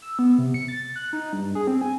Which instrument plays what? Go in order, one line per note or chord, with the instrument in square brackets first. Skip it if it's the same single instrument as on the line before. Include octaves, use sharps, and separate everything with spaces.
[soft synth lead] E6
B3
C3
C#7
A6
F#6
D#4
G2
G#4
C4
G#5